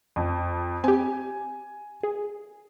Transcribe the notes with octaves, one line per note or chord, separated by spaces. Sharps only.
F2
C4 G4 G#5
G#4